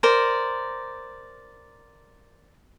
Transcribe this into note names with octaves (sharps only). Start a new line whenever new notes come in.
A#4 C5 D5